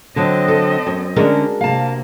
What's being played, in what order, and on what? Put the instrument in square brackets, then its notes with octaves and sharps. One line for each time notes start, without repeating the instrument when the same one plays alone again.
[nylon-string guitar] D3 F#3 [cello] C4 D#5
[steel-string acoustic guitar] A4
[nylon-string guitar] F#2
[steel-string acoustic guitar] D3 C#4 [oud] G#3 [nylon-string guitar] D4 F#4 A#4
[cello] C3 A#3 [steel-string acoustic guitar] F5 A5